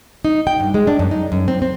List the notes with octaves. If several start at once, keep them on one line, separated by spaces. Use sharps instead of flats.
D#4
G5
G2
G#3
D4
F#2
D#4
F#2
C4
C4